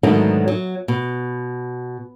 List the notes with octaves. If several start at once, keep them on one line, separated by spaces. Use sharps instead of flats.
G#2 B2 D3 D#3 F#3 A3
F#3
B2